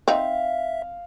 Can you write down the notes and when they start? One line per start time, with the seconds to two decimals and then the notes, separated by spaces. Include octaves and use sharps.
0.08 C4 D#4 E5 F5